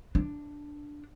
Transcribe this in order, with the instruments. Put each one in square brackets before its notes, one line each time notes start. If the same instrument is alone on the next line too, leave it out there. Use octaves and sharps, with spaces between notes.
[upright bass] D4